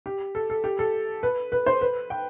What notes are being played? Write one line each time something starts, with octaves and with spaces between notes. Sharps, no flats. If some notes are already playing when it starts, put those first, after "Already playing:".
G4
A4
A4
G4
A4
B4
B4
C5
B4
G5